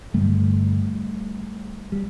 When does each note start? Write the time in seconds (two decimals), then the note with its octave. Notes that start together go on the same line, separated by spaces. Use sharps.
0.14 G2 D3 G3 A3
1.92 G3